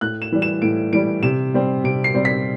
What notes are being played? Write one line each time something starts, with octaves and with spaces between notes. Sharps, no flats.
A2 F#6
E7
E3 G3
E7
A2 D7
E3 G3 D7
C3 E7
G3 C4
C3 D7
C7
G3 C4
B6